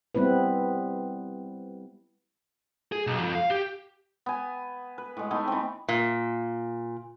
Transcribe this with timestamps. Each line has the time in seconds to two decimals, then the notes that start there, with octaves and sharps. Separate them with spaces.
0.15 G3 B3 C4 E4 B4
2.92 G#4
3.07 B1
3.20 F2
3.35 F5
3.50 G4
4.26 B3 G#5
4.98 B4
5.17 A2 G#3
5.31 A3 B3 D#4 G#5
5.48 E3 C4
5.88 A#2